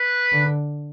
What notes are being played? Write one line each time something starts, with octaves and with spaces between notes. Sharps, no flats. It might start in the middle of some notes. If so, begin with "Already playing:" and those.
Already playing: B4
D3